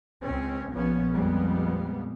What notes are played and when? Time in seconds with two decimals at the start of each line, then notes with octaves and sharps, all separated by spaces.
0.21 C#2 C4 C#4
0.71 A#1 F3 B3 C#4
1.12 F2 A#2 G3 G#3 B3